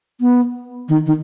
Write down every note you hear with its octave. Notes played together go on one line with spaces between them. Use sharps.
B3
D#3
D#3